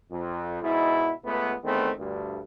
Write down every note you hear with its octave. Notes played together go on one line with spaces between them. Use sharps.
F2
G#2 B2 E4
C#2 A3 B3
E2 D#3 A3 B3 C4
D2 G2